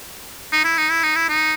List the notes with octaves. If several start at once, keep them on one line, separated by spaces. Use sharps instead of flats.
D#4
E4
D#4
E4
D#4
E4
D#4